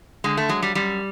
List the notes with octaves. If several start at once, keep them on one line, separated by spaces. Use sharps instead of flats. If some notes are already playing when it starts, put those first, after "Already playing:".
D3 G#3
A3
F#3 G#3
G3
F#2 G3